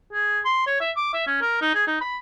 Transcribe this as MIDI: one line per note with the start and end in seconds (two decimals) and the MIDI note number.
0.13 0.40 68
0.45 0.66 84
0.67 0.77 73
0.81 0.91 76
0.96 1.11 86
1.14 1.24 76
1.27 1.41 61
1.42 1.61 70
1.61 1.74 63
1.75 1.84 68
1.87 1.97 63
2.01 2.18 83